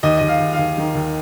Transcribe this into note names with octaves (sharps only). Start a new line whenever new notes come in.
D#2 D#5
D#2 D#5
F5
D#2
F5
D#2
D#3
D#2